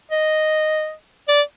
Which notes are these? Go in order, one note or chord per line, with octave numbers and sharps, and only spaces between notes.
D#5
D5